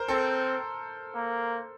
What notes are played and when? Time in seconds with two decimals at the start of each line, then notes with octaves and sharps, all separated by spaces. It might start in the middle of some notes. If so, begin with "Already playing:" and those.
Already playing: A#4 C5
0.08 C4 A4
1.14 A#3